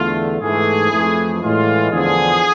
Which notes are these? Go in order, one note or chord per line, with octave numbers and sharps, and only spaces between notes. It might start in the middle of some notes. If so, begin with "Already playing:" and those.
Already playing: E2 D3 A3 F4
G#2 E3 A3 G#4
F2 E3 A3
A2 E3 G#3 F4
E2 D3 F3 G#4